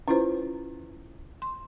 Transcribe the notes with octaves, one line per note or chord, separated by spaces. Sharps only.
C#4 E4 F4 B4 C5
C6